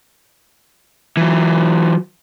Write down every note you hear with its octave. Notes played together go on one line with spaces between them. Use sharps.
E3 F#3